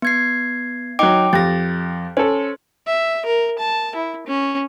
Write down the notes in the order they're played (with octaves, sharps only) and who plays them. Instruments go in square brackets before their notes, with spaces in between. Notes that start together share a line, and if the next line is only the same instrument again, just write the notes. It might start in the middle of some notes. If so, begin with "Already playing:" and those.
[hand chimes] B3 G#6 C7
[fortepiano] F#3 D#4 [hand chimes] G5 D6 D7
[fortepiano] F2 G4 [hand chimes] A6 A#6
[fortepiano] C#4 A4 [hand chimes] C5
[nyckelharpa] E5
A#4
A5
E4
C#4